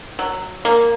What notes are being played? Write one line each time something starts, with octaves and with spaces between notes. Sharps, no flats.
F#3
A#3